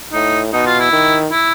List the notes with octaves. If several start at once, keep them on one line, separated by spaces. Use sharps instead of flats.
A2 D#4
B2 D#4
F4
E4
D#3
E4